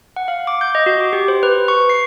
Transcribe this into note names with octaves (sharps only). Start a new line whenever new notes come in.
F#5
F5
D6
G6
D#5
F#4
D6
G4
C5
B4
C#6
C7